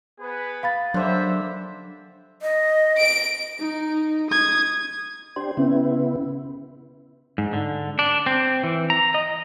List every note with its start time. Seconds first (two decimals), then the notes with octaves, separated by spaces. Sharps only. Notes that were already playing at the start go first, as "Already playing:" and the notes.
0.20 B3 G#4 B4
0.63 F5 B5 A6
0.94 D3 F#3 A#3 G4 C5 E5
2.42 D#5
2.99 D7
3.60 D#4
4.30 D#6 G#6
5.36 D4 G4 C5 C6
5.57 C#3 B3 C#4 E4
7.38 G#2
7.53 D3
7.99 D4
8.26 C4
8.64 E3
8.90 A#5
9.14 D#5